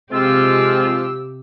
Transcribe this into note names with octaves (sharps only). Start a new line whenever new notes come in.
C3 F3 G#3 C4 F4 G4 E6